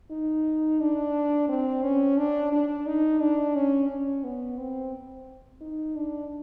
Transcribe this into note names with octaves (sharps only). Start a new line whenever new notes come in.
D#4
D4
C4
C#4
D4
D4
D#4
D4
C#4
C#4
B3
C4
D#4
D4